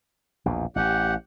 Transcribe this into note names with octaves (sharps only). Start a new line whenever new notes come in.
A#1 E2 B2
A1 G4 F#5